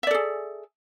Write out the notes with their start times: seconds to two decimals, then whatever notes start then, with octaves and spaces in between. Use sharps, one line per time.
0.03 E5
0.07 D5
0.11 A4
0.14 G#4